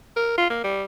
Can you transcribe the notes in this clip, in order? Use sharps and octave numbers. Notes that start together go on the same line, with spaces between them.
A#4
F4
A#3
G3